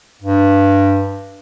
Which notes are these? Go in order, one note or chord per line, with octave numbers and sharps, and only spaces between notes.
G2